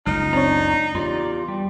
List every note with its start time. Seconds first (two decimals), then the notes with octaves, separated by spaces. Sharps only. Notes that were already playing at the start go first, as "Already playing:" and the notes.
0.06 F#1 C#2 C#3 D#4 F6
0.33 C4 D4 C#5 D5 A#5
0.95 E2 F4 G4 D5 A#5
1.48 G3